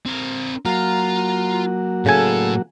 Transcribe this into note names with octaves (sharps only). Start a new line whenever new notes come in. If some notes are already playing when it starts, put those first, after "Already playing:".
C4 A#4
F#3 A#3 F4 F#4 A#5
A2 C#3 A4 G#5 A5